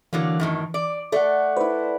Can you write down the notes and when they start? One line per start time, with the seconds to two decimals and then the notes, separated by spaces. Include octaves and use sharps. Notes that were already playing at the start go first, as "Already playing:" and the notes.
0.13 D3 E3 F#3 A#3
0.40 F#2 A2 D#3
0.74 D5
1.12 A3 A4 D5 F#5
1.56 E4 B4 C5